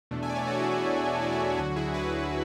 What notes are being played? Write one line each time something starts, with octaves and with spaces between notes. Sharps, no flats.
E2 B2 A3 D4
E5 G#5
D5
C#5 E5
F#4 A4
E4 G#4
E4 G#4
E4
F#4
E4
D2 D3 F#3 F#4
E4 G#4
G#4 B4